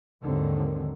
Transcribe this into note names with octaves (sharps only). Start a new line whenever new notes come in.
D#2 G#2 D3 D#3 F#3 C4